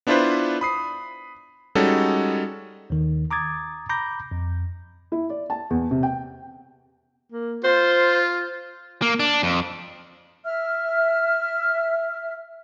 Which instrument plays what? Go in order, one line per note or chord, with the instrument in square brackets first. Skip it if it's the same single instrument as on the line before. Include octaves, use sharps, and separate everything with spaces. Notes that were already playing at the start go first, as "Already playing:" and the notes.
[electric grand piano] B3 D4 E4 F4 B4 C5
B5 D#6 C7
G3 G#3 C#4 D#4 F#4 A4
[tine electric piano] D#2 D#3
A#5 D6 D#6 G#6 A6
A#5 B5 D6 G6 A#6
F2
[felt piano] E4
D5
A5
E2
C3
G5
[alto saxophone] A#3
[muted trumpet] F4 [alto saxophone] C5
[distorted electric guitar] A#3
D4
F2
[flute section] E5 F6